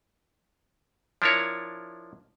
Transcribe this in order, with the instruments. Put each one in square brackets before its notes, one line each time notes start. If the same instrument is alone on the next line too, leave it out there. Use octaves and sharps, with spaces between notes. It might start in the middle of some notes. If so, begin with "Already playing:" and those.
[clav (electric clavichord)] F3 D4 E4 A#4 C#5